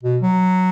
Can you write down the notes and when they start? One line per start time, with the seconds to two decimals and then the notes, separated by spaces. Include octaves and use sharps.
0.03 B2
0.22 F#3